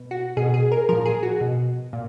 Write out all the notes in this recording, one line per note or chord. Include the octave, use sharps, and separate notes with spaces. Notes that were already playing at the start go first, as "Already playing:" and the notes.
Already playing: B2
F#4
B2 G#4
G#4
A#4
A#2 F3 A#4
G#4
F#4
B2
A#2